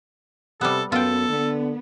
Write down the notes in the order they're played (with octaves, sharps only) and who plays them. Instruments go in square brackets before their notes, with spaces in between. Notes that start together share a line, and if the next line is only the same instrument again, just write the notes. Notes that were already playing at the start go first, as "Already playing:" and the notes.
[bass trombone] C3 [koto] G3 B3 [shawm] A4
[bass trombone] F#2 [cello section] B3 [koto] F4 G5 [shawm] A4
[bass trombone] D3 [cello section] B3